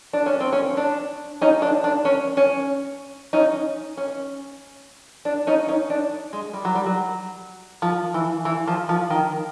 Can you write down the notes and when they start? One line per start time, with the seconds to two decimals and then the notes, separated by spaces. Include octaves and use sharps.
0.13 D4
0.26 C#4
0.40 C4
0.53 C#4
0.77 D4
1.41 C#4 D#4
1.62 D4
1.84 D4
2.05 C#4
2.37 C#4
3.33 C#4 D#4
3.97 C#4
5.25 D4
5.47 C#4 D#4
5.68 C#4 D#4
5.90 D4
6.33 G#3
6.53 G3
6.65 F#3
6.75 G3
6.86 F#3
7.82 F3
8.14 E3
8.45 E3
8.67 F3
8.89 F3
9.10 D#3